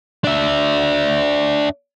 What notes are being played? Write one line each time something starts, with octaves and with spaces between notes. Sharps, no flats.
D4 E5